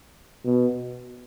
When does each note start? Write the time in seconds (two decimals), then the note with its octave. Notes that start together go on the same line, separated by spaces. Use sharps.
0.45 B2